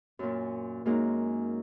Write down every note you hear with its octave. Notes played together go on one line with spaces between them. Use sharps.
F#2 A#2
F#2 G#3 A#3 D#4